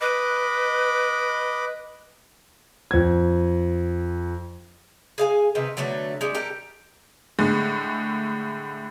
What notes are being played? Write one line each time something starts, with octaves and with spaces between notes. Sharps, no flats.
B4 D#5 B5 D6
F2 G#6
G#4 F5 G#5
C3 D#3 B4
D3 F#3 A3 B3
G3 G#3
G4 A4 A#4
A2 D3 G#3